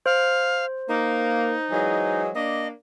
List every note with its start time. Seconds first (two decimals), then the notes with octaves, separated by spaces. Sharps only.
0.06 C5 F5
0.88 A#3 D#4
1.70 E3 F#3 G#3
2.35 A#3 D4 D#5